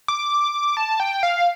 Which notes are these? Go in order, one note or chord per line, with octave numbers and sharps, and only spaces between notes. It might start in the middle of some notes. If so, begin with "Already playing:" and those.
D6
A5
G5
F5